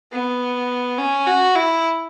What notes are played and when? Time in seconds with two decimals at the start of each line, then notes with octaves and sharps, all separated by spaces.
0.12 B3
0.98 C#4
1.27 F#4
1.55 E4